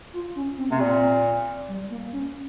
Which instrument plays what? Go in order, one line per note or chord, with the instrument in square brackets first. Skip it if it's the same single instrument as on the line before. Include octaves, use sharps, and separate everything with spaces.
[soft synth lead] F4
C#4
C4
[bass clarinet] C3 [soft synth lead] A#3
[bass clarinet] A#2 [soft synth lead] C4
[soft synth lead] G3
A#3
C#4